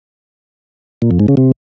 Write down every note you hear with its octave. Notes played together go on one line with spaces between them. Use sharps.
A#2
F2
G#2
C#3
C3